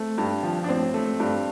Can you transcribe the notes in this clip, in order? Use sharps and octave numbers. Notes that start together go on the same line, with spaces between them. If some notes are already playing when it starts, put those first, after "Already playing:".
Already playing: A3 C4
G2
F3
D4
A1 C4
A3
G2